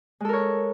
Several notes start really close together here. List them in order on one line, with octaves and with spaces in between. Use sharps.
G#3 A4 A#4 C#5